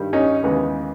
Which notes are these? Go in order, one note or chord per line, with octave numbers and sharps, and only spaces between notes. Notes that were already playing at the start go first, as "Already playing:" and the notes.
Already playing: G2 D#3 G3
C#4 D#4
D#2 C#3 E3 G#3 B3